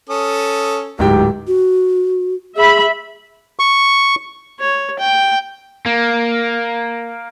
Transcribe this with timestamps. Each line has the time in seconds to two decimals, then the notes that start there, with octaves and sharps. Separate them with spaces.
0.10 C#4 A4 D#6
0.99 D1 G#2 G4 G5
1.47 F#4
2.57 G#4 E5 B5
3.59 C#6
4.60 C#5
4.99 G5
5.86 A#3